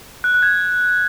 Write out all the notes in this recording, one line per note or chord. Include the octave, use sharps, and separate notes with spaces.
F#6
F#6
G#6